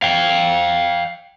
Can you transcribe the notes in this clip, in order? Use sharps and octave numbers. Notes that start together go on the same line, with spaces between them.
F5 G5